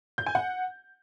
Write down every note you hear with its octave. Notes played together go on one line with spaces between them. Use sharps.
G6
G#5
F#5